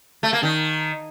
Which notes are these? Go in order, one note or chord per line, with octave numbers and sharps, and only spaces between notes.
A3
A#3
D#3